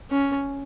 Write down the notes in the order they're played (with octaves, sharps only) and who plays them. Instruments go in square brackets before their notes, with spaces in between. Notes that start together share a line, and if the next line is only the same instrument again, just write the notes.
[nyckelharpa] C#4